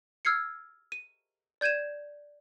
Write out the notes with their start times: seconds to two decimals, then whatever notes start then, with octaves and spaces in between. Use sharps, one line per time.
0.25 E6 F6 G#6 C7 C#7
0.92 D#7
1.61 D5 G6 G#6 D#7 E7